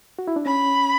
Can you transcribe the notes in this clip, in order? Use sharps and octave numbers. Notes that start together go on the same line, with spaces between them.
F#4
E4
D4
C#4 B5